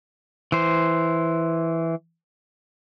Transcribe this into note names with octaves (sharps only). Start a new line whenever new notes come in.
E3 C5